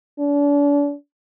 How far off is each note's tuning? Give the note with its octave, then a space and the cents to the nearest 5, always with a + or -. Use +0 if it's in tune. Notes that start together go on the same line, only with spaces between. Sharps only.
D4 -40